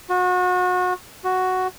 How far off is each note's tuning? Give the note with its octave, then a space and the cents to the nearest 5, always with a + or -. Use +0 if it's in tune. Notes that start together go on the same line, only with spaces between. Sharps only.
F#4 -30
F#4 +5